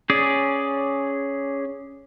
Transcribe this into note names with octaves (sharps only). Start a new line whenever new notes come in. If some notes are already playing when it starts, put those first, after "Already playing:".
C#4 G#4 D5